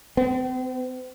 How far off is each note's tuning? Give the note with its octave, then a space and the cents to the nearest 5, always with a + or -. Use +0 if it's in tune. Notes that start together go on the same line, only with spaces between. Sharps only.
C4 -40